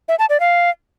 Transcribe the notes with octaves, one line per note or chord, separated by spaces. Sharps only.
E5
A5
D5
F5